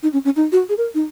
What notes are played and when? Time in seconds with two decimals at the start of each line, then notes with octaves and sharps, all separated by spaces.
0.03 D#4
0.13 C#4
0.25 C#4
0.36 D#4
0.52 F#4
0.69 G#4
0.78 A#4
0.95 D#4